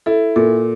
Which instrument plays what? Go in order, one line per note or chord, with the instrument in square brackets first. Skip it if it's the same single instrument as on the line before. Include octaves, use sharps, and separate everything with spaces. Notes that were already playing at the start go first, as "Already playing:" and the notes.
[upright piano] E4 [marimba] A4
[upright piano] A#2 [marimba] A4